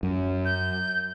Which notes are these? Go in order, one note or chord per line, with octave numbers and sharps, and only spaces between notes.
F#2
G6